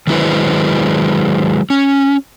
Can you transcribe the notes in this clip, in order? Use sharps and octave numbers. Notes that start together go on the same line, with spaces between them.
D#3 F#3 G#3 E4 B4 C5
C#4